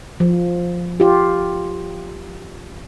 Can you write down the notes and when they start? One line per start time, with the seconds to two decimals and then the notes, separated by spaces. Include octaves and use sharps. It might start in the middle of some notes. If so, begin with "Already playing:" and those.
0.20 F3
1.00 F4 G4